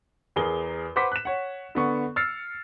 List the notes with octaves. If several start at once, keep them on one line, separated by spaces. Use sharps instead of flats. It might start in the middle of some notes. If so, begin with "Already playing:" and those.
E2 G#4 A#4 G7
B4 C5 F#5 D6 B6
F#6 E7
C#5 F#5
D3 B3 C#6
E6 F6 A6 C7 C#7